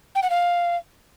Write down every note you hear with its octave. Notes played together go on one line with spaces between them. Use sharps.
G5
F#5
F5